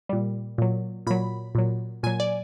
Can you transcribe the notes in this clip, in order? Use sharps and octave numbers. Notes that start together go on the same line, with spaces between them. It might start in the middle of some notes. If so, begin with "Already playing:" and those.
A#2 G3
A#2 F#3
A#2 F#3 B5
A#2 F#3
A#2 F#3 G#5
D5